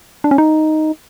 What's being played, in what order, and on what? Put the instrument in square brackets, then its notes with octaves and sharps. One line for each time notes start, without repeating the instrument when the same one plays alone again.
[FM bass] D4
C#4
D#4